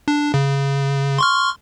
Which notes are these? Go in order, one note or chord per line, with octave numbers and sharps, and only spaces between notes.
D4
C#3
C6 C#6 F6